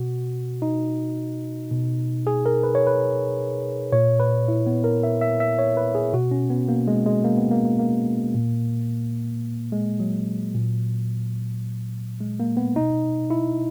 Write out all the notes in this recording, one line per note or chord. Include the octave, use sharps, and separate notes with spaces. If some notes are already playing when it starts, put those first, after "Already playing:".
Already playing: B2 F#4
D#4
B2
G#4
A#4
B4
C#5
B4
A#2 C#5
B4
E4
B3
A#4
E5
E5
E5
C#5
B4
G#4
B2 F#4
C#4
B3
A#3
G#3
G#3
A#3
B3
A#3
A#3
A#3
A#2
G#3
F#3
A#2
G#3
A#3
B3
B2 D#4
E4